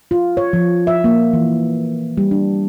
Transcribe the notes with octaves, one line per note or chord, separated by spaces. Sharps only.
F4
C#5
F3
E5
A#3
E3
G3
D4